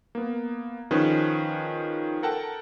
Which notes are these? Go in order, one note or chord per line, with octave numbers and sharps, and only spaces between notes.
A#3 B3
D#3 F3 C#4 G#4 B4 C5
A4 A#4 F#5 G5 A5